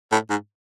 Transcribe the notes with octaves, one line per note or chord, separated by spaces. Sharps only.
A2
G#2